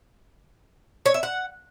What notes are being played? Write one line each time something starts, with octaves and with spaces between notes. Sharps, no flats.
C#5
E5
F#5